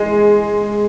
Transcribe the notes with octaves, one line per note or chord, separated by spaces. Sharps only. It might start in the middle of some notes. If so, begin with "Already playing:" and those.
Already playing: G#3